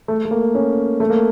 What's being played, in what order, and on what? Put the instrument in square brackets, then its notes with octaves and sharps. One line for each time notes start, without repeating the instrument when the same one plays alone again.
[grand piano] A3
A3
A#3
C#4
A3
A#3